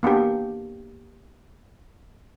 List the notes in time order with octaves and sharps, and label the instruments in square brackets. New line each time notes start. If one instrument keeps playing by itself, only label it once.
[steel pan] A#3 B3 D4 G4